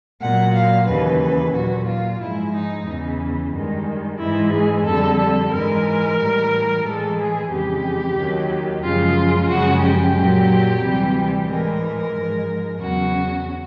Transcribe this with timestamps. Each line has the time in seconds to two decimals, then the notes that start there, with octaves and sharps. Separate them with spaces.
0.21 A#2 F#3 F#5
0.54 F5
0.87 D#2 C#3 E3 B4
1.21 B4
1.55 A#2 F#3 F#4
1.87 F4
2.20 G#2 F3 G#3 E4
2.54 D#4
2.87 E2 C#3 E3
3.53 G2 D#3 G#3
4.20 G#2 E3 G#3 E4
4.53 G#4
4.85 F2 D3 G3 A4
5.19 A4
5.52 G#2 E3 G#3 A#4
6.18 A2 E3 G3
6.84 A2 E3 G#3 A4
7.18 G#4
7.51 F2 C#3 E3 G#3 G4
8.17 D#2 D#3 F#3
8.83 F#2 C#3 F3 G#3 F4
9.50 F#2 C#3 F3 G#3 F#4
9.83 G4
10.16 A#2 F#3
10.82 D2 C3 E3 G3
11.48 A2 E3 G#3 A#4
12.16 G#2 F3 G#3
12.81 E2 C#3 F#3 F#4